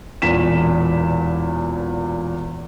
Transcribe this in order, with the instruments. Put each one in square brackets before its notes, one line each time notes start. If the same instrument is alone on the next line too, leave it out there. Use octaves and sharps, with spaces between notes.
[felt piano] E1 E2 A#2 B6 E7